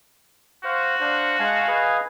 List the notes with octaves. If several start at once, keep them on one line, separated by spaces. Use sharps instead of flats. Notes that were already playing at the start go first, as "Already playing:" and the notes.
F#4 C5 F5
D4 C5 F5
G#3 F5 G#5 A5 F#6
G#4 B4 D#5